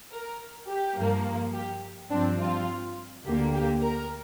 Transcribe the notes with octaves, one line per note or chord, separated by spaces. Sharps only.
A#4
G4
G2 F3 A#3
G4
G2 F3 C4 D4
F4
D2 D3 A#3 G4
G4
A#4